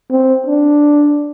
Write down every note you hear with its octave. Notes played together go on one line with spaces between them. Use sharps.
C4
D4